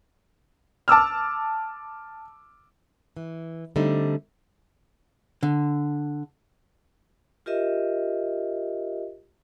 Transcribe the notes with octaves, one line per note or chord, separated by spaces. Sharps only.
A5 D6 E6 F6
E3
D3 G3 A3 C4 D#4
D3
F4 G4 A#4 D#5 E5